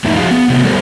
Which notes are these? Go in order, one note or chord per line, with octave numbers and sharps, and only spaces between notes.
F2 A2 D#4 E4
F2 F#4 G#4 F5 A#5
B3
C3 F#3 G#3 A3 B3
G3 E4 G4 A4 A#4 C5